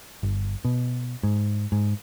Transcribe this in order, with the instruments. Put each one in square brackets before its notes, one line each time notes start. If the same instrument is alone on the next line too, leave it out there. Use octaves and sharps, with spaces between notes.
[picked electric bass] G1
B2
G#2
G#2